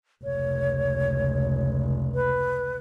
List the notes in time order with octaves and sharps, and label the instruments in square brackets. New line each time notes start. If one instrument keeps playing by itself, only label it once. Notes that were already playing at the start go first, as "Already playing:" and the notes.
[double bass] F1 C#2 [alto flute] C#5
[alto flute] B4